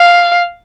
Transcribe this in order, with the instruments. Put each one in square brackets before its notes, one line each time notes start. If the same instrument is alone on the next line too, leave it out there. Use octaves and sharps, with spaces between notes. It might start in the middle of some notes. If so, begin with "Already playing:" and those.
Already playing: [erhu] F5